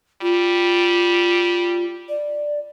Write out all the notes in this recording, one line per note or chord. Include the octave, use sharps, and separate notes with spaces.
G3 F4
D5